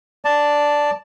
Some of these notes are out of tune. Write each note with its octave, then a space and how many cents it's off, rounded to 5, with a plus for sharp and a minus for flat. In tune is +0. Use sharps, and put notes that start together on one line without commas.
D5 -5 A5 +0